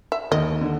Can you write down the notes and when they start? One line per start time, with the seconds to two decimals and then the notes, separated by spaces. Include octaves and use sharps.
0.12 E5
0.31 D#2 D#3 D#5
0.61 D3